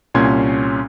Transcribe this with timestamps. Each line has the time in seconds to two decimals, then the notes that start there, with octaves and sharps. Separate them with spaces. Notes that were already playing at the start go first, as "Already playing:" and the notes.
0.14 C2 A#2 C#4 C6 G#6